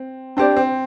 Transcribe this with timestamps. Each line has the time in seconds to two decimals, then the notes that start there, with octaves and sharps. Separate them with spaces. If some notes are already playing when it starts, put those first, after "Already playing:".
Already playing: C4
0.37 C4 D4 G4 D5
0.57 C4